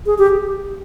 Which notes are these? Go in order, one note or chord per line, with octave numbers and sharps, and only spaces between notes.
G#4
G4